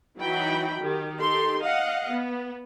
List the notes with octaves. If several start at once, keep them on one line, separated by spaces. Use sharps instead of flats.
E3 F#3 D#4 F#4 G5 B5
D#3 G4
D#4 G4 A4 C6
D#5 F5 F#5
B3